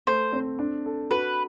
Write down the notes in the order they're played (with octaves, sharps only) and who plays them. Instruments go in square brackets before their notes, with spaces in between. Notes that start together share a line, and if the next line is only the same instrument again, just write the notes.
[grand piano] A3 [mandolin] C5
[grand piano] C4
D4
A4
[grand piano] F#4 [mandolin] B4